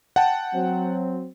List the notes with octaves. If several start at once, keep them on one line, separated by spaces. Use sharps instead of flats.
F#5 G5 A5
F#3 C4